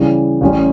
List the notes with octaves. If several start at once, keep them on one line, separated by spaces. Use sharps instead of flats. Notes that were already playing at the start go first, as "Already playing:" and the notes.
Already playing: C#3 E3 G3
A1 A2 G3 C#4 G4